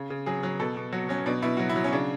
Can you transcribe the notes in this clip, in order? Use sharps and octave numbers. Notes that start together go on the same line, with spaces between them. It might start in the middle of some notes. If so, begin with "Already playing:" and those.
Already playing: C#3
C#3
F#3 G#4
F#3
B2 A4
B2
F#3 F#4
F#3 C#4
B2 D4
B2 E4
F#3 F#4
E4
F#3
C#4
C#3 D4